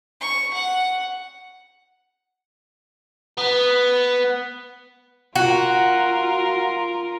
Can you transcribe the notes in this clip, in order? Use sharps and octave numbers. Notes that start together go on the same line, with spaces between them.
C#6
F#5
B3
F4 F#4 A#4